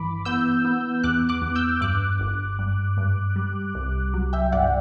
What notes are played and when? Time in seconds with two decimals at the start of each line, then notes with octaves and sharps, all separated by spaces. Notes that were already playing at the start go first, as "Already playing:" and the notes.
Already playing: G1 E3 B5 D6
0.25 B3 E6 G6
0.65 B3
1.04 E2 D6 F#6
1.29 D6 F#6
1.42 E2
1.55 E6 G6
1.81 G2 D6 F#6
2.20 G1
2.59 G2
2.97 G2
3.36 G3
3.75 C2
4.14 F#3
4.33 E5 G5
4.52 G1 D5 F#5